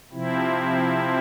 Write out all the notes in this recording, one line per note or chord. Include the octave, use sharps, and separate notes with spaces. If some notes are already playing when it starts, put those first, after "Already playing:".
C3 F3 C4 E4